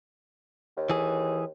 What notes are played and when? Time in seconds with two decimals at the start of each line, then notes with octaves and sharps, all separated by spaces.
0.77 D#2
0.90 E3 G#4